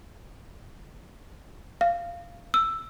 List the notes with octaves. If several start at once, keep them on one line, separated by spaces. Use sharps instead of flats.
F5
E6